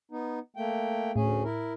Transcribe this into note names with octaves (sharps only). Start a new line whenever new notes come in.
B3 D#4
A3 A#3 G5
D2 A2 C#4 G#4
E4 A#4